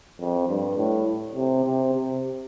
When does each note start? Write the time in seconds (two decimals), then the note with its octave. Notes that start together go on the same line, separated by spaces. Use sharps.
0.20 F2
0.49 G2
0.77 A2
1.35 C3
1.64 C3
1.94 C3